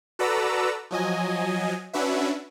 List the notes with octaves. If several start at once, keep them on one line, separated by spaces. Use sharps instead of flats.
F#4 A4 B4 D5 A#5 E6
F3 F#3 D#5 G#5
C#4 D4 F#4 B4 E5